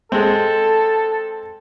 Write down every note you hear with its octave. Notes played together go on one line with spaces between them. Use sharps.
G#3 C4 A4